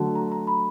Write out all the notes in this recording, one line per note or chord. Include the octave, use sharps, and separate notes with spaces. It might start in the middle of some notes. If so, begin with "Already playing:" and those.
Already playing: D3 F#3 A3 D4 F#4 A5
A#5
A#5
B5